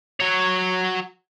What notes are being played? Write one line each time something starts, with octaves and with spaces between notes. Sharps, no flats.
F#3 C#5